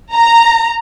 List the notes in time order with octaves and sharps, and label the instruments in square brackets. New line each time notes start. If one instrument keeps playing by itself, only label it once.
[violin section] A#5